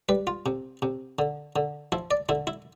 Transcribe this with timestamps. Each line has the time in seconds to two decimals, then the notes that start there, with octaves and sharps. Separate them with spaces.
0.09 G3 B4
0.27 F4
0.46 C3
0.82 C3
1.19 D3
1.56 D3
1.92 F3 E4
2.11 D5
2.29 D3 E4
2.47 E4